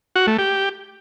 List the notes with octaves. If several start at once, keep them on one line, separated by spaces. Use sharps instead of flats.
F#4
A3
G4